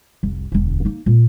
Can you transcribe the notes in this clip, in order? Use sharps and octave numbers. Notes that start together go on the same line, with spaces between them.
F1 C2
E1 D2
A#3 D#4
A#2